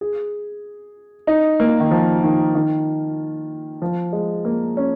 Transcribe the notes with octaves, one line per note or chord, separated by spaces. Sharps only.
G#4
D#4
A#3
D#3
F3
D#3
D#3
F3
G#3
A#3
C#4